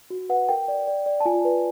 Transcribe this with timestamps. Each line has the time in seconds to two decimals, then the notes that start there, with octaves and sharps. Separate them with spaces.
0.10 F#4
0.29 B4 F#5
0.49 A#4 G5
0.68 D5
0.87 D5
1.06 D5
1.20 A5
1.26 F4 G#5
1.45 B4